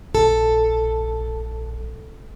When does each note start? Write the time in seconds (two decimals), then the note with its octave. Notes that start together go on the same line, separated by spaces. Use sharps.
0.15 A#1 A4